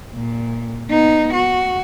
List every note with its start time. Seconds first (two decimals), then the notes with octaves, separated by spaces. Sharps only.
0.14 A#2
0.89 B3 D#4
1.33 F#4